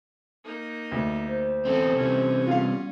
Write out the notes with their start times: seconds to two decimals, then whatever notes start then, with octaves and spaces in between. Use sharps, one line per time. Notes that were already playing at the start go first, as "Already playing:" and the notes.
0.44 A#3 D#4
0.92 D2
1.27 C5
1.65 E2 C4 A4
1.96 C3 E3 C#4
2.47 G3 B3 F4 F5